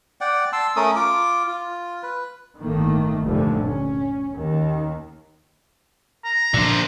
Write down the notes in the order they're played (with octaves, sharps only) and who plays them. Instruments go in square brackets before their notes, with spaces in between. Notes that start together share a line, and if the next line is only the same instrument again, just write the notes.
[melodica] D5 F#5 G5
A5 C6 E6
A3 C#4 A#4 D#6
F4 D6
F4
B4
[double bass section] G1 A2 D#3 A3 A#3
F1 D2 G2 A#2 D3 F3
C#4
D#2 D#3
[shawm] A#5
[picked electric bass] A#2 F3 D4 [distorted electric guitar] D3 C5